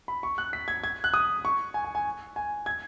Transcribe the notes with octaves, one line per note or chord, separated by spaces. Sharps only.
B5
C#6
F#6
B6
G#6
G#6
F#6
D#6
C#6
G#5
G#5
G#5
G#5
G#6